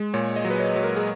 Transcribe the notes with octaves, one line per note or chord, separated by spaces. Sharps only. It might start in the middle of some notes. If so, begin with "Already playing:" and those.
Already playing: G#3
A#2 C#5
D#5
F#3
B4
C#5
F#3
A#4
G#4